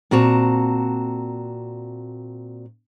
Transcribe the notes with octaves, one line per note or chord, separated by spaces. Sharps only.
A#2 C4 F#4 A5 A#5